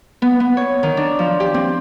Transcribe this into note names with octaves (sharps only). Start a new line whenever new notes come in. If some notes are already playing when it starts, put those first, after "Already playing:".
B3
B3
C#5
D#3
D4
F3
G4
C4